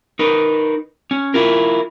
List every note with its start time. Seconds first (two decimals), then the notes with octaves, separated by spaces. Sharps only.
0.19 D#4 A#4 B4
1.11 C#4
1.34 E4 F4 A#4